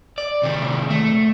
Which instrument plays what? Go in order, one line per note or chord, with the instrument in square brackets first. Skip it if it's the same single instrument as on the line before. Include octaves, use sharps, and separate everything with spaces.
[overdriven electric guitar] D5
C3 D#3
A3